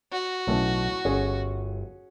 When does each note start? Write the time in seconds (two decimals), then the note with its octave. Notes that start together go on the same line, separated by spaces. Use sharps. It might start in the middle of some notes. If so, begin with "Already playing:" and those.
0.12 F#4
0.47 B1 A2 A3 C#4
1.05 G1 C#4 G#4